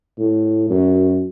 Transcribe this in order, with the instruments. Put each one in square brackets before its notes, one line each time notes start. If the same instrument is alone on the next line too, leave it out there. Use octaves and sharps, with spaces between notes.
[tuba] A2
F#2